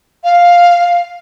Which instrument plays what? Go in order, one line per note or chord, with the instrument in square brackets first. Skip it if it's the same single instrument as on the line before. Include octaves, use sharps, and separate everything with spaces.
[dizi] F5